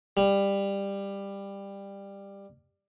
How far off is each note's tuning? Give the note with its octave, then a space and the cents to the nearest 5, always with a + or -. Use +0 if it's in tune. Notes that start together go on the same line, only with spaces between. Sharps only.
G3 +15